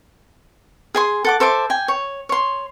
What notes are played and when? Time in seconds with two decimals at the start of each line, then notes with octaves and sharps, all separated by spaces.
0.95 G#4 G#5 C6
1.25 A4 F#5 D6
1.40 A4 C5 E5 D6
1.70 G5 G#5
1.88 C#5
2.29 C#5 C6